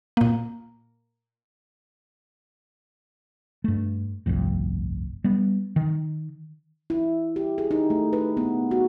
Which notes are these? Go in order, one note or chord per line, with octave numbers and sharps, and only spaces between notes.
A#2 A#3
G2 A3
G1 C2 F2 A2
G3 B3
D#3
E4
G4
G#4
D#4
A3
B4
B3
F#4